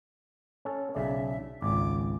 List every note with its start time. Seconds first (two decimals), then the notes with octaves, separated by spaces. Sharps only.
0.65 C#4 A4
0.95 B1 C#3 D5 E5
1.62 G#1 C#2 D6